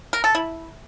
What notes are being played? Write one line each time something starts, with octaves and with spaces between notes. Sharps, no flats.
A#4
A4
E4